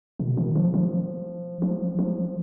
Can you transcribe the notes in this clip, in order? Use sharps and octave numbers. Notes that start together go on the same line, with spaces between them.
B2
D#3
F3
F3
F3
F3